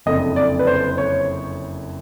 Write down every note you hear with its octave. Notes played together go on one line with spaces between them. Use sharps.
F#1 F2 D3 D#5
D5
B4
C5
C#5